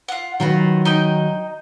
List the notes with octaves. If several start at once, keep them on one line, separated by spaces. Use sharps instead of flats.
F4 F#5
D#3 F#3 F4 F#4 B4
D#4 D#5 G5